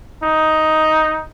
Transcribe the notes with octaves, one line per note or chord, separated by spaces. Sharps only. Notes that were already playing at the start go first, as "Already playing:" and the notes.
D#4